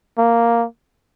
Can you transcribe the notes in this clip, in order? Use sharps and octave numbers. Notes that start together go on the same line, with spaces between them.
A#3